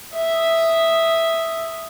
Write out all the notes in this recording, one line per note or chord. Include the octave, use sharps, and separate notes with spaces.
E5 D#6